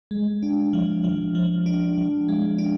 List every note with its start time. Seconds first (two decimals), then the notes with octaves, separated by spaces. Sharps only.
0.11 G#3
0.43 D4
0.73 F3
1.04 F3
1.35 F3
1.66 D4
1.98 F3
2.28 G#3
2.58 D4